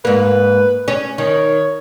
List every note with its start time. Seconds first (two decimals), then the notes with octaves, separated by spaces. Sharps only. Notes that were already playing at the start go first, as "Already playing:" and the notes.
0.05 G#2 A#3 B4
0.88 C#4
1.18 D#3 C#5